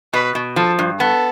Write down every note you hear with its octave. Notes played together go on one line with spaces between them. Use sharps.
B2 B4
B2
F3 A4
G2
B3 A4